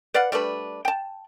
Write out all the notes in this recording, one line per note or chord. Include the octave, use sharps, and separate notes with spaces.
B4 D5 F5 F#5
G3 A3 D4 B4
G5 A5